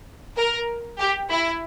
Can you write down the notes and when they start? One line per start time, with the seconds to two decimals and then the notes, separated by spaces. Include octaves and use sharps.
0.36 A#4
0.99 G4
1.29 E4